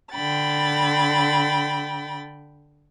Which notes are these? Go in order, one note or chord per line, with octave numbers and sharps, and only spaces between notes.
D3 G5 B5 A6